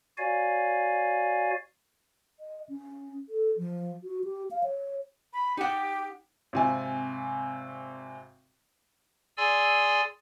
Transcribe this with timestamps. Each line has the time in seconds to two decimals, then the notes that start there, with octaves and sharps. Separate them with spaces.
0.18 F#4 C#5 D5 F5 G#5
2.40 D#5
2.69 C#4
3.29 A4
3.57 F3
4.04 F#4
4.24 G4
4.51 F5
4.64 C#5
5.33 B5
5.57 D#4 G4 F#5
6.53 G#1 C3 G#5
9.37 G#4 D5 G#5 C6 E6